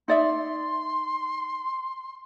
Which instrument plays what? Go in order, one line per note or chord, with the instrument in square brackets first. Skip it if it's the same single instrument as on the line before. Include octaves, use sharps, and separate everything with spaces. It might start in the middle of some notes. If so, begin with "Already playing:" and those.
[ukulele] D#4 D5 E5 [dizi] C6